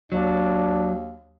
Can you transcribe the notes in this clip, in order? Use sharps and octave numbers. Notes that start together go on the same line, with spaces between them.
D#2 F#3 D4